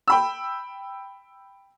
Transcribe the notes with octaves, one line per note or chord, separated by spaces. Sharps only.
G5 B5 E6